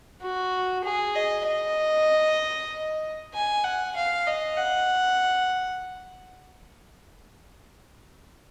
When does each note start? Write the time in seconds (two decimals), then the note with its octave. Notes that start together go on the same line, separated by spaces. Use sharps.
0.22 F#4
0.84 G#4
1.16 D#5
1.47 D#5
3.34 G#5
3.64 F#5
3.96 F5
4.27 D#5
4.58 F#5